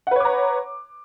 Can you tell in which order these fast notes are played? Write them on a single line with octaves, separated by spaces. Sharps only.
F#5 B4 C#5 D6 A#5